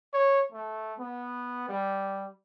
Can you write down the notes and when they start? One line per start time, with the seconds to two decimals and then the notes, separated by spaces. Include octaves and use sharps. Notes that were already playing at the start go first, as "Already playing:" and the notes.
0.14 C#5
0.52 A3
0.99 B3
1.69 G3